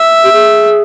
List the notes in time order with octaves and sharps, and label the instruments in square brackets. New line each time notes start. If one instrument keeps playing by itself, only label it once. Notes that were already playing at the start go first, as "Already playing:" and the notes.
Already playing: [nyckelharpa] E5
[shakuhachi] G4
G#4